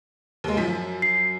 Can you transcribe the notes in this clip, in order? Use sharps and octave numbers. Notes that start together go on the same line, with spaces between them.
D#2 G#3
F#2 F3 B6
C7